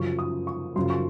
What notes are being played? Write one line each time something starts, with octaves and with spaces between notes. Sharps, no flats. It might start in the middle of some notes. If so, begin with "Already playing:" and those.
Already playing: F#2 C#3 F3 C#6
D#6
C#6
F#2 C#3 F3 C6
C#6